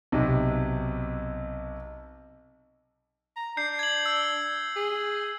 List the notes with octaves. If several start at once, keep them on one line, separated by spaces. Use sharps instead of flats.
B1 C3
A#5
D4 G6 C7
G#6 F#7
E6
G#4